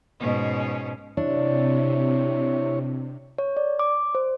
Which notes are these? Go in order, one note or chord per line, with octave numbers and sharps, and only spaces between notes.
G#2 B2 C#4
C3 D4 E4 C#5
C#5
D5
D6
C5